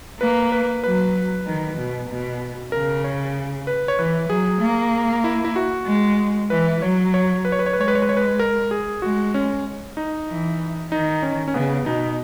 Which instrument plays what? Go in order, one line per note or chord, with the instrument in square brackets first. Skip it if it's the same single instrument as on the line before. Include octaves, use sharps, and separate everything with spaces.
[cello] A#3 [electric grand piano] B4
[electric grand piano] B4
[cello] F#3 [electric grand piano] B4
[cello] D#3
B2
B2
[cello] C#3 [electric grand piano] A#4
[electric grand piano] C#5
B4
C#5
[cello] E3 [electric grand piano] B4
[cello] F#3 [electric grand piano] G#4
[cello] A#3
[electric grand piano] E4
E4
F#4
[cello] G#3
[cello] E3 [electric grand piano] B4
[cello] F#3 [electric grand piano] C#5
[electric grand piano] C#5
B4
C#5
B4
C#5
B4
[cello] G#3 [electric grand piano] C#5
[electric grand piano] B4
C#5
B4
C#5
B4
A#4
G#4
[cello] G#3 [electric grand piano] F#4
[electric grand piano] C#4
D#4
[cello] E3
[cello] D#3 [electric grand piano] D#4
[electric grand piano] C#4
C#4
[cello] C#3 [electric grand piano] B3
[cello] B2 [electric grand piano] D#4